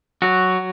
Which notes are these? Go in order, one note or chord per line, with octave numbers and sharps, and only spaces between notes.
F#3 F#4